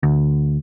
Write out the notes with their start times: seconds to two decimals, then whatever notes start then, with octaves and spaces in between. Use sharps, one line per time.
0.03 D2